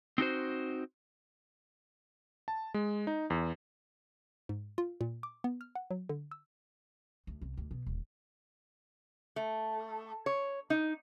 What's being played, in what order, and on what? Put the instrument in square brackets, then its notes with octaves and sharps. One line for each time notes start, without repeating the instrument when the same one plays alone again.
[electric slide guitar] C4 D#4 F#4 C5
[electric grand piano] A5
G#3
D#4
E2
[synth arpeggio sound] G#2
F4
A#2
D6
B3
F6
F#5
F#3
D3
E6
[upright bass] D2
C2
D2
B2
D#1
[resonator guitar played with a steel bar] A3
C#5
D#4